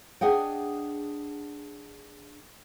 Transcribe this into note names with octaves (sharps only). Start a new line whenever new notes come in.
D4 G#4 D#5 F#5 G5